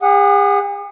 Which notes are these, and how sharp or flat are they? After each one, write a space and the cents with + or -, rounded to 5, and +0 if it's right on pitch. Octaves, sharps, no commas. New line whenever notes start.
G#4 -45 F#5 -5 D#6 +0